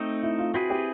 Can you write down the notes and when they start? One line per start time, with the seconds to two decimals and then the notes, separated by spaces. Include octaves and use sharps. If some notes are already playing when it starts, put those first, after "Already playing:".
Already playing: A3 C4 D#4
0.23 E4
0.39 F4
0.54 C4 E4 F#4 G#4 B4
0.70 G4